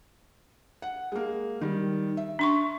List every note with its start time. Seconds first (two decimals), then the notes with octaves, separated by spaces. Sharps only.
0.82 F#5
1.12 G#3 A#3
1.61 D#3 G3
2.17 E5
2.39 D4 C6 C#6